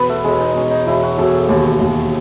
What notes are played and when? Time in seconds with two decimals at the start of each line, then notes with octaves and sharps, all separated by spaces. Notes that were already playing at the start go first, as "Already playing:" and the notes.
Already playing: E1 B3 B4
0.09 A3 A4
0.24 E1 G#3 G#4
0.40 D#4
0.55 E1 C#4
0.71 D#4
0.87 E1 E4
1.03 F#3 F#4
1.17 E1 A3 A4
1.49 D#2
1.80 D#2